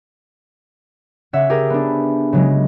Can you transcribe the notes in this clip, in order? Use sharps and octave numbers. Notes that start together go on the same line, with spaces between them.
C#3 C#4 C#5 E5 F#5
G4 G#4 A#4
B3 D4
C#3 F#3 G#3